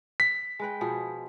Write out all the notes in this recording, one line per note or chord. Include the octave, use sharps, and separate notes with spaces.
B6
G#3 B4 G5
B2 F3 G#4